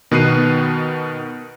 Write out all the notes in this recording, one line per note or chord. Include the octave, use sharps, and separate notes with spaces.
B2 D#3 B3 F#6 C7 D#7